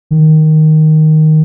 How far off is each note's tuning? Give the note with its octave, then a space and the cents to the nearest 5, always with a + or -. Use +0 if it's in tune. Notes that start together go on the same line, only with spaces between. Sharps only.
D#3 +0